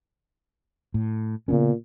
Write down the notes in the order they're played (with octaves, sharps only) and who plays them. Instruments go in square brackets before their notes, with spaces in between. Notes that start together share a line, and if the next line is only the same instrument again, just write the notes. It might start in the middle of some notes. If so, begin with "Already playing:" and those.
[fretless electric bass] A2
[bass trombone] A#2 [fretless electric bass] C#3 B3 C#4